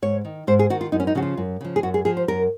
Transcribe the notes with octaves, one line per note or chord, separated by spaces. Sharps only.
G#2 C#5
D#3
G#2 C5
G#4
D#3 F#4
F4
F#2 D#4
C#4
D#4
C#3 F3 F#4
F4
F#2
C#3 F3
G#4
F#2 F#4
G#4
F3 G#4
C5
F#2 A#4